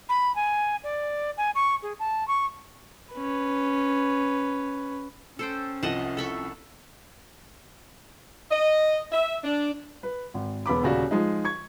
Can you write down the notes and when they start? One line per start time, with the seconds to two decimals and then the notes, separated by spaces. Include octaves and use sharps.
0.09 B5
0.36 G#5
0.84 D5
1.37 G#5
1.55 C#6
1.82 G#4
2.00 A5
2.28 C#6
3.14 C#4 B4
5.39 C#4 A4 C5 G5
5.83 C2 F3 D#5 F#5 A5
6.17 A4 B5 C#6
8.51 D#5
9.12 E5
9.44 D4
10.03 B4
10.34 G#1
10.66 E1 B3 B5 D6
10.83 D#1 C#3 F#4 D5
11.11 F3 G#3 D#4
11.45 C#6 G#6